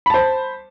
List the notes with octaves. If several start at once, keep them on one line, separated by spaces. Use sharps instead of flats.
C5 A5 B5